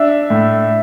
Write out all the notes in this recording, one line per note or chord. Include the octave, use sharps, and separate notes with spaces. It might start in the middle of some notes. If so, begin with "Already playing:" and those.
Already playing: D4 E5
A2